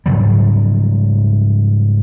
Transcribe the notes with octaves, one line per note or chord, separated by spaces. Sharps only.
G#2 C#3 F#3 G3